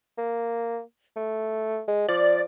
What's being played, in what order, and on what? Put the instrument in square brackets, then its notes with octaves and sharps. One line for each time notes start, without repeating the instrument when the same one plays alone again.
[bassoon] A#3
A3
G#3
[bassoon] F3 [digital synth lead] D5